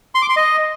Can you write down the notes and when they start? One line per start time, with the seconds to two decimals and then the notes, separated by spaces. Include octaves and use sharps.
0.15 C6
0.22 D6
0.29 C6
0.36 D#5